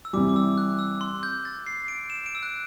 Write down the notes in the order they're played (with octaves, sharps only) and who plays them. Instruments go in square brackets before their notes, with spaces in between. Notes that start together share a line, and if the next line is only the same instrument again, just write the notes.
[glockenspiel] E6
[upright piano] C3 E3 G3 [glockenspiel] D6
[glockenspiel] D6
E6
F#6
E6
C6
G6
A6
C7
D7
E7
D7
E6
F#6